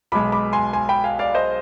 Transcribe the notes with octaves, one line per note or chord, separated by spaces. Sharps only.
B1 B2 G#3 B5 D6
B5 D6
G#5 C6
G#5 C6
G5 B5
F5 G#5
D5 F5
C5 D#5